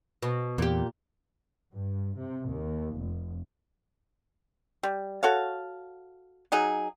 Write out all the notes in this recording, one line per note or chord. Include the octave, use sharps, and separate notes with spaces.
B2
E2 A#2 G4
G2
C3
D#2
F1
G3
F#4 A4 C#5 F5
F#3 D#4 G#4